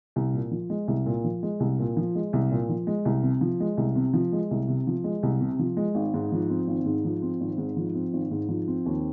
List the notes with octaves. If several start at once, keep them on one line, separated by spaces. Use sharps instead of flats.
C2
A#2
F3
G#3
C2
A#2
F3
G#3
C2
A#2
F3
G#3
C2
A#2
F3
G#3
C2
C3
F3
G#3
C2
C3
F3
G#3
C2
C3
F3
G#3
C2
C3
F3
G#3
G#1
G#2
F3
C4
G#1
G#2
F3
C4
G#1
G#2
F3
C4
G#1
G#2
F3
C4
D#2